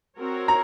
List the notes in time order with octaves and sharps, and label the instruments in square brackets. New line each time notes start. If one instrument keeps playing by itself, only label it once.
[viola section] C4 F#4 A#4 C#5
[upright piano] A#5